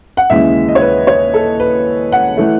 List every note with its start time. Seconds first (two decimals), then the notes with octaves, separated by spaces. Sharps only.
0.17 F#5
0.30 D#2 C#3 E3 G#3 E5
0.68 D#5
0.75 C#5
0.81 B4
1.07 C#5
1.34 A4
1.60 B4
2.12 F#5
2.37 E3 A3